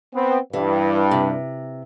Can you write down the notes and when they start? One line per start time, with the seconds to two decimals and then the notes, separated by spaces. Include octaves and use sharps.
0.15 B3 C4
0.53 G2 E3
1.11 C3